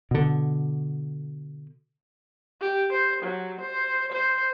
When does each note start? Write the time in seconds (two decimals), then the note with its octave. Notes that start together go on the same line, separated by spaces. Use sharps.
0.11 B2 D3
2.61 G4
2.92 C5
3.23 F#3
3.61 C5
4.12 C5